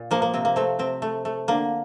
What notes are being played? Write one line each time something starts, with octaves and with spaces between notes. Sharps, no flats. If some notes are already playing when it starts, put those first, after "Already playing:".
Already playing: A#2
F3 A#3
A#3
C3 C4
A#3
A3 C4
C3 C4
A3
A3
D3 A#3